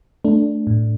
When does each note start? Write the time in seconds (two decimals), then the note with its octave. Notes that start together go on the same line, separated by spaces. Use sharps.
0.24 A3 D4
0.67 A2